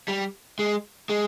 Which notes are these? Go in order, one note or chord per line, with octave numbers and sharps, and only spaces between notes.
G3
G#3
G#3